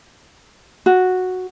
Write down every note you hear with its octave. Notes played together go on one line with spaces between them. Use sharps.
F#4